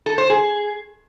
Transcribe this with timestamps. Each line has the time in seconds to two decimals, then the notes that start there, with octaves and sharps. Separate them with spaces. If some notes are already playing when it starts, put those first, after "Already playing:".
0.06 A4
0.18 C5
0.30 G#4